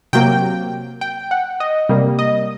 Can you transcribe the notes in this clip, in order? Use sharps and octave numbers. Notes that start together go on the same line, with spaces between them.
C3 F#3 A#3 G5
G5
F#5
D#5
C3 G3 A#3
D#5